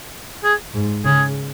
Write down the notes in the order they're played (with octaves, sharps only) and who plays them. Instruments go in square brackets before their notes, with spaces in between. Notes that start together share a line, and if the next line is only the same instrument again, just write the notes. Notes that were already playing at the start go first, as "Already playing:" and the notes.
[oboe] G#4
[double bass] G#2
[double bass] C#3 [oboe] G#4